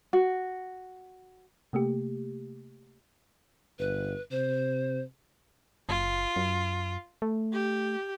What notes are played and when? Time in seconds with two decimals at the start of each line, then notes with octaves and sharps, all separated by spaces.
0.13 F#4
1.73 C3 A3 A#3 G4
3.79 G1 B4
4.31 C3 C5
5.89 F#1 F4
6.36 F#2
7.22 A3
7.53 G4